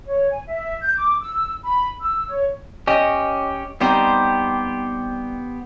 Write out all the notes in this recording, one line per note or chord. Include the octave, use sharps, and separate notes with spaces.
C#5
G#5
E5
G6
D6
E6
B5
E6
C#5
C#4 G4 D#5
G3 B3 C4 D#4 G4 C5